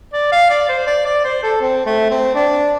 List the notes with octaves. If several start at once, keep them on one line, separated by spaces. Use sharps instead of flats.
D5
F5
D5
C5
D5
D5
C5
A4
C4
A3
C4
D4